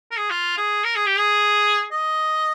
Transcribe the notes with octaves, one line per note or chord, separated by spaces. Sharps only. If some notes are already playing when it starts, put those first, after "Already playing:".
A#4
G#4
F4
G#4
A#4
G#4
G4
G#4
D#5